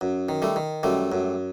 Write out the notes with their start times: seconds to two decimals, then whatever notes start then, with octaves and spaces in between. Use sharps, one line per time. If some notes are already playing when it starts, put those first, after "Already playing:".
0.01 F#2
0.29 D#3
0.42 G3 A3
0.56 D#3
0.83 F#2 G3 A3
1.12 F#2